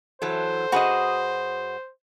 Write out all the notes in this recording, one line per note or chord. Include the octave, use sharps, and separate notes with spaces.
E3 F#3 A4 C5
F#2 F#4 G#4 B4 D#5